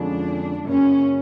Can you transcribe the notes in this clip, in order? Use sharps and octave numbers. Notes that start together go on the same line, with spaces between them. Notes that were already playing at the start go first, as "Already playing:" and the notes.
Already playing: F2 D3 F3 G#3 C#4 D4
F#2 C#3 F#3 A#3 C#4